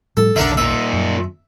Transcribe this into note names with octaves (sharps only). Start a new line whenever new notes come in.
A2 F3 G3 A4
F1 B1 D3 D4 A#4 E5
A#2 D#4 E5
F#2